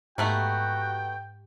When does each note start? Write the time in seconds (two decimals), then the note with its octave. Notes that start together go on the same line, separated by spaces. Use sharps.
0.18 G#2 A3 B3 D#4 F#4 G4 G5